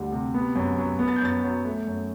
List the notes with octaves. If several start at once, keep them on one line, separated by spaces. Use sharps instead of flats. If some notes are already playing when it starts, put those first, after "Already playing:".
Already playing: D2 G3
C3
B3
F#2
F#3
B3
A6
G6
F#2 A6
F#3
A3
F#2